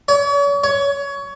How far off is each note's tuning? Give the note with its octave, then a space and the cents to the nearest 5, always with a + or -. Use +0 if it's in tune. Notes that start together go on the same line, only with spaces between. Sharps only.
C#5 +40
C#5 +20